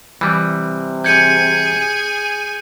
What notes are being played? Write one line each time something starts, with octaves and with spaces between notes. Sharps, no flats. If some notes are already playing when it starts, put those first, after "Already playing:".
C3 E3 G3
G#4 G#5 G6 G#6 C#7